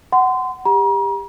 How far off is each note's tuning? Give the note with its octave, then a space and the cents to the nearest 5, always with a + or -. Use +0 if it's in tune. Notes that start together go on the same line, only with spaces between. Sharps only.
F#5 +15 C6 -30
G4 +30 A#5 +40